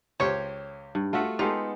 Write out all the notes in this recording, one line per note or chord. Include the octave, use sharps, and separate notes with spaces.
C#2 G4 C5 C#5
G2
A3 F4 F#4 E5 F#5
G#3 B3 D#4 F4 G4 A4